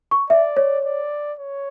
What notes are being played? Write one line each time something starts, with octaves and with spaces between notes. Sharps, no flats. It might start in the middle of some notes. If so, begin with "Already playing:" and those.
C#6
D5 E5
C#5
D5
C#5